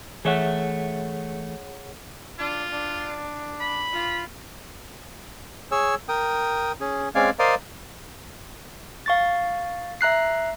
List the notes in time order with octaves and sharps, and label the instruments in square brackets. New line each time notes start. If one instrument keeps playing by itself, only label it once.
[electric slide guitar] E3 A3 E5 [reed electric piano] G#4 C#5 F#5
[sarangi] D4 [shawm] F4
[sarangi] D4
[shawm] B5
[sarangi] F4
[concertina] G#4 C#5 G#5 E6
A#4 G5 D#6
C#4 G#4
G#3 C4 C#4 D5 F5 G#5
A#4 C5 D5 D#5 F5
[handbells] F5 C#6 A6
E5 A#5 F#6 C7